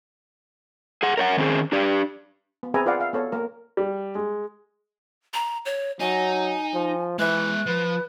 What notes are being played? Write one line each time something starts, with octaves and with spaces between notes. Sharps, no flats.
G#4 F#5
A#4 C#5 F#5
D#3 C4 C#4 G#4
D4 G4 D5
B3
C4 G#4 B4 E5 G#5 A#5
F4 B4 D5 F5 F#5
E5 F5
B3 A4 C#5
A#3 A#4
G3
G#3
A#5
C#5
F#3 D#4 G#5
F3
E3 G#3 E5 F#6
F3 B4